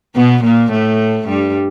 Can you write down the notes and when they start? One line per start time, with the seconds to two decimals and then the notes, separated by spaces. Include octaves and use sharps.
0.15 B2 B3
0.44 A#2 A#3
0.72 A2 A3
1.29 G2 G3